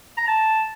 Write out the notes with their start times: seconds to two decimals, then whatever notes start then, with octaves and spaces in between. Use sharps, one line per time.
0.18 A#5
0.28 A5